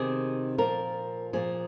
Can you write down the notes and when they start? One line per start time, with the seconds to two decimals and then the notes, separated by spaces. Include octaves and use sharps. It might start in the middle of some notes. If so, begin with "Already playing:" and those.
Already playing: C3 D#3 G#4
0.58 A#2 F3 A#4
1.33 A#2 F3 G#4